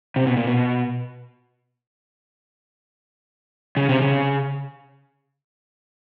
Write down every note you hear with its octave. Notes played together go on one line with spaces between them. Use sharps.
C3
B2
A#2
B2
C#3
C3
C#3